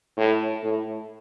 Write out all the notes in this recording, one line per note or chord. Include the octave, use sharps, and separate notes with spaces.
A2
A2